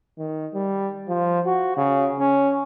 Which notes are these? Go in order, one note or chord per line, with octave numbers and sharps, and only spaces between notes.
D#3
G3
F3
F#4
C#3
C#4